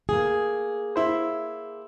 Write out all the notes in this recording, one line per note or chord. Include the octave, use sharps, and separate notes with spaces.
A#3 G#4
E4 C5